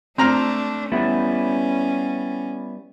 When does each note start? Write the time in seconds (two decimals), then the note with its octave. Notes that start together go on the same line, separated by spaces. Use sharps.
0.18 A3 C4 D4 A#5 F6
0.92 G3 B3 C#4 E4